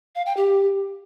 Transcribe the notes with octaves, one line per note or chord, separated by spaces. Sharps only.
F5
G5
G4